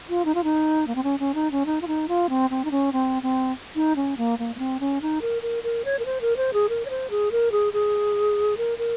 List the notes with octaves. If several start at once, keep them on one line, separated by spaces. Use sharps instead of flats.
F4
D#4
F4
D#4
A#3
C4
C#4
C#4
D#4
C#4
D#4
F4
D#4
F4
C4
C4
D#4
C#4
C4
C4
D#4
C#4
A#3
A#3
A#3
C4
C#4
D#4
A#4
A#4
A#4
C#5
A#4
C5
A#4
C5
G#4
A#4
C#5
C5
G#4
A#4
G#4
G#4
A#4
A#4